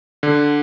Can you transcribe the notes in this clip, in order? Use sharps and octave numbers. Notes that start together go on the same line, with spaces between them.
D3